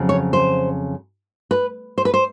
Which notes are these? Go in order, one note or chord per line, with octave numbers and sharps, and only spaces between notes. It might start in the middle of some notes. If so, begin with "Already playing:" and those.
Already playing: F2 C#3 F#3
C#5
C5
B4
C5
B4
C5